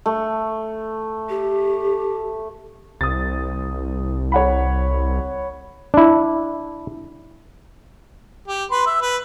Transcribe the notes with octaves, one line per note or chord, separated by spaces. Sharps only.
A3
G4
C2 D#6 A6
C#5 F#5 B5
D4 E4
G4
B4 C6
E5
B4